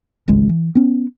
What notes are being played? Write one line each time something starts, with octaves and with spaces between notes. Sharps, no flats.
D1 G#1 C#2 G#3
E3
B3 C#4